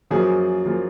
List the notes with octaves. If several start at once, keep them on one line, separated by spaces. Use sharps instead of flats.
F#2 F3 A#3 F4 G#4
F3 A#3 F4 G#4